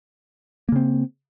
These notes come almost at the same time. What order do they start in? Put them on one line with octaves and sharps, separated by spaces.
A#3 C#3 C4